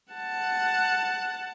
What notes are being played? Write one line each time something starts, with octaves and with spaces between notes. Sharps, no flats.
F#5 A5